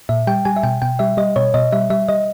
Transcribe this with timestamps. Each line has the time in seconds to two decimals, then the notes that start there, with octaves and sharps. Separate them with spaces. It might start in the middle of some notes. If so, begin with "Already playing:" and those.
0.09 A#2 E5
0.27 G3 G5
0.45 G3 G#5
0.56 E5
0.63 B2 G5
0.82 B2 G5
0.99 G3 E5
1.17 G3 D#5
1.36 B2 C#5
1.54 B2 D#5
1.72 G3 E5
1.90 G3 E5
2.09 G3 D#5